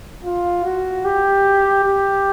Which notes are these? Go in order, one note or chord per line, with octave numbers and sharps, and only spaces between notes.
F4
F#4
G4
G4